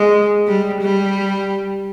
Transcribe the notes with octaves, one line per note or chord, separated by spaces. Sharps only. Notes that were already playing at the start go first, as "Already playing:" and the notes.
Already playing: G#3
G3
G3